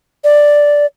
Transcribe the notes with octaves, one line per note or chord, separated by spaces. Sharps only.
D5